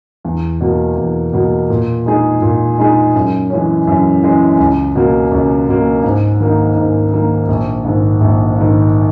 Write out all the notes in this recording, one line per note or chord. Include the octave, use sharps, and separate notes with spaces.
E2
B2 A#3
E2
B2 A#3
A#2
G#3 D#4 G#4
A#2
G#3 D#4 G#4
F#2
E3 G#3 C#4
F#2
E3 G#3 C#4
C#2
B2 A#3
C#2
B2 A#3
G#2
D#3 A#3 D#4
G#2
D#3 A#3 D#4
A#1
G#2 D#3
A#1
G#2 D#3